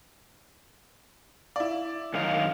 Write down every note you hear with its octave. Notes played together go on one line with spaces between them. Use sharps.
E4 D5
F#2 D#3 F5